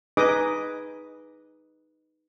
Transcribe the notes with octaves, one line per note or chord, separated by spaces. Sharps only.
D#4 G#4 B4 D#5 D6 D#6